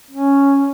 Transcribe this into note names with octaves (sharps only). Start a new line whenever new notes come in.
C#4